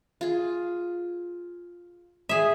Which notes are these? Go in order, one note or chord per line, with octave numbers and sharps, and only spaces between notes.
F4 G#4
G#4 E5